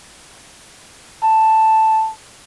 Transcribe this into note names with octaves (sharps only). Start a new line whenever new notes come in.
A5